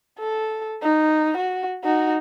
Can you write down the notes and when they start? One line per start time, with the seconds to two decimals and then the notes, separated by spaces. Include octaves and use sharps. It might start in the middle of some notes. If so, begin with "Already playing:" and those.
0.19 A4
0.83 D#4
1.38 F#4
1.84 D#4 F#4